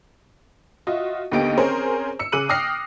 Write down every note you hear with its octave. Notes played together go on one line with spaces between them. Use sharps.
F4 F#4 D#5 E5
D#2 D3 B3 G4 D#5 D7
C4 C#4 G#4 A#4 C5 C#5
E6 C#7
C#3 G#4 D6 F#6 D#7 F#7
G5 D#6 F6 A#6 C7